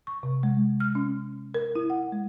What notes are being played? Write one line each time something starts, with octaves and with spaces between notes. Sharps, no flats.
C#6
C3
G#3
F6
C#4
A#4
E4
F#5
G#3